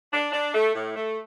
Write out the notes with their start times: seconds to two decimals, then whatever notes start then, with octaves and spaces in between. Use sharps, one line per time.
0.12 D4
0.32 D4
0.54 A3
0.74 A2
0.95 A3